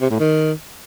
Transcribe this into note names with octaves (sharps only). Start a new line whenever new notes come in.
C3
A2
D#3